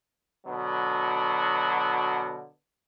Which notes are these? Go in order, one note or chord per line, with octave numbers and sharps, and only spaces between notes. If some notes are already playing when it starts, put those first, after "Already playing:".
B2 D3 F#3